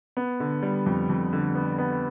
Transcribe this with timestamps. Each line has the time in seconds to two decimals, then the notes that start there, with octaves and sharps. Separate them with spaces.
0.17 B3
0.40 D3
0.63 G3
0.86 F2
1.09 F2
1.33 D3
1.55 B3
1.78 B3